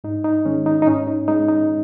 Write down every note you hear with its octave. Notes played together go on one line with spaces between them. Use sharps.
G#2 D#4
D#4
D#3 G#3 C#4
D#4
D#4
G#2 C#4
D#4
G#3 D#4
D#4